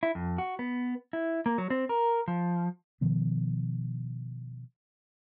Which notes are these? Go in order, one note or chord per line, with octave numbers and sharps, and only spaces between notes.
E4
F2
F#4
B3
E4
A#3
F#3
C4
A#4
F3
B2 D#3 F3 B3